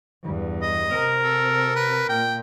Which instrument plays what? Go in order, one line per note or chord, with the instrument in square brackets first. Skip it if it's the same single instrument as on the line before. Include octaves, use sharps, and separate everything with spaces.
[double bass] E2 G2
[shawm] D#5
[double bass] C3 C4 [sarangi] A#4
[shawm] A4
B4
[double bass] A#2 [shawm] G5